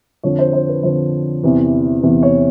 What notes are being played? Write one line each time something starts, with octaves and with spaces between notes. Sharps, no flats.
F2 D3 F3 C#5
C5
C5
B4
F2 D3 F3 C5
E2 C3 E3
E2 C3 E3
C#5